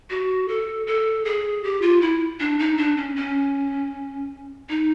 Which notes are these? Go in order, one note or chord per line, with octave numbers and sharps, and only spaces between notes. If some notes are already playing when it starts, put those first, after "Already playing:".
F#4
A4
A4
G#4
G4
F4
E4
D4
D#4
D4
C#4
C#4
D#4